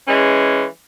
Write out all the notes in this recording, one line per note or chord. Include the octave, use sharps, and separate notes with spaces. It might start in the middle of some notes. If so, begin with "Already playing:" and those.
E3 G#3 C#4